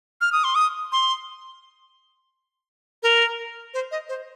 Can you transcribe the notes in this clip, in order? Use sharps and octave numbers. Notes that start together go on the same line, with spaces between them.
F6
D#6
C6
D#6
C6
A#4
C5
D#5
C5